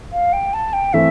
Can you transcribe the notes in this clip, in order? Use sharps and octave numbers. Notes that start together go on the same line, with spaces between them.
F5
G5
A5
G5
E3 A3 C4 E5